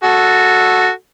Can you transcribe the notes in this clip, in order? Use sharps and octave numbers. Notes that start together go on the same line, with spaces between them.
F#4 A4